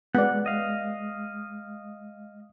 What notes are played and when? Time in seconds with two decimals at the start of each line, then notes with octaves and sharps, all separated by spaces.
0.15 G#3 B3 D5 F#5
0.46 D#5 F5